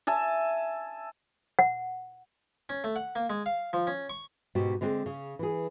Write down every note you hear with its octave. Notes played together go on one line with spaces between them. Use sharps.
E5 G#5 A5
F#5
C#4
A3
F#5
A#3
G#3
F5
F3
C#4
C#6
G#2 B2 F#4 G4
D3 G#3 C4
C#3
E3 G#4